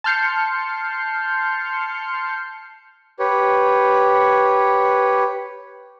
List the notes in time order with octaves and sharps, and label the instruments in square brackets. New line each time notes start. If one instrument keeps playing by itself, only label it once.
[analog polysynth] A5 C6 F6 G6 C7 C#7
[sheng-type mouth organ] G4 B4 C#5